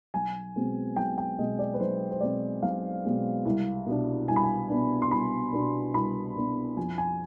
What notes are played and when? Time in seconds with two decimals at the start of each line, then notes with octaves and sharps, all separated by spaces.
0.14 B1 G#5
0.56 B2 G#3 C4
0.96 B1 G5
1.18 G5
1.38 B2 G#3 C4 D#5
1.59 D5
1.74 B4
1.80 B1 C5
2.11 C5
2.21 B2 G#3 C4 D5
2.62 B1 F5
3.04 B2 G#3 C4
3.45 C2
3.86 B2 B3 D4
4.28 C2 G#5
4.36 B5
4.43 G#5
4.69 B2 B3 D4
5.02 C6
5.11 C2 B5
5.53 B2 B3 D4
5.94 C2 B5
6.36 B2 B3 D4
6.77 F2 G#5
6.98 G#5